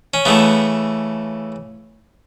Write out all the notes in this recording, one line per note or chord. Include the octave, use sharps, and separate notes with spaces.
C#4
C#3 E3 A3 B3